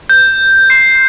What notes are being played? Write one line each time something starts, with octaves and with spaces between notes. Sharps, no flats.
G6
C7